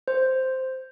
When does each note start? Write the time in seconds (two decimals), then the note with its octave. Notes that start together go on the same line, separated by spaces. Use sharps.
0.08 C5